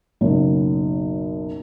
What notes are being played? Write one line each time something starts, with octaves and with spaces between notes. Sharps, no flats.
F#1 B1